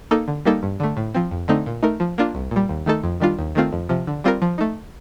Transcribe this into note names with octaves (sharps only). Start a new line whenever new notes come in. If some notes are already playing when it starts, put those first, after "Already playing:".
A#3 D#4 A4
D3
G3 A#3 D#4 A4
G2
D3 A3
A2
F3 C4
F2
D3 A3 C4 D#4
A#2
A3 D#4 A#4
F3
A#3 D4 F4
C2
A#2 G3
D#2
D#3 A3 D#4 A4
F2
D#3 G3 D4 F4
D#2
D#3 A3 C4 F4
F2
C3 F3
D3
G3 C4 F4 A#4
F3
A3 D#4